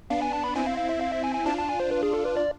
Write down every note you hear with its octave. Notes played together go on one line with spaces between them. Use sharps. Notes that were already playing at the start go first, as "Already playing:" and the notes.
B3 D4 F5
G#5
A5
B5
C4 E4 G#5
F5
F5
E5
F5
E5
G#5
G#5
D4 F4 A5
A5
G#5
C5
B4
G#4
A4
B4
D5